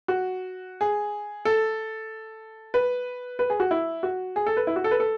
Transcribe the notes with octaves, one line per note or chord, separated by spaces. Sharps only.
F#4
G#4
A4
B4
B4
G#4
F#4
E4
F#4
G#4
A4
B4
E4
F#4
A4
B4
A4